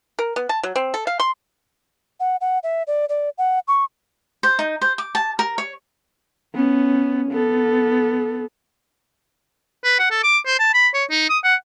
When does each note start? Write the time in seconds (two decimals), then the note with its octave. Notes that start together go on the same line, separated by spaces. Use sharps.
0.19 A#4
0.36 B3
0.49 A5
0.63 F#3
0.76 C4
0.94 A4
1.07 F5
1.20 C6
2.20 F#5
2.41 F#5
2.63 E5
2.87 D5
3.09 D5
3.38 F#5
3.68 C#6
4.43 C5
4.59 D#4
4.81 C5
4.98 D6
5.15 A5
5.39 A#4
5.58 C#5
6.55 B3 C#4
7.31 B3 A4
9.84 B4
9.99 F#5
10.11 A4
10.24 D6
10.46 C5
10.59 A5
10.74 B5
10.94 C#5
11.10 D#4
11.30 D#6
11.44 F#5